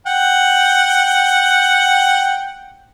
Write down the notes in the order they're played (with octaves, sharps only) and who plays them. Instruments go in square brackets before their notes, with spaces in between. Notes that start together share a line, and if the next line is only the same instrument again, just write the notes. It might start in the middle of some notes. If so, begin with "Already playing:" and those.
[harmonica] F#5 G5